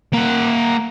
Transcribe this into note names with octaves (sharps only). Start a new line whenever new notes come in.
A#3 F#5